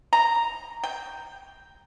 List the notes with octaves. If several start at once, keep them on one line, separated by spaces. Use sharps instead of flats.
A#5
G5